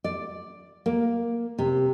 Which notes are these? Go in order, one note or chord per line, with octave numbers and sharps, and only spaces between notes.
D5
A#3
C3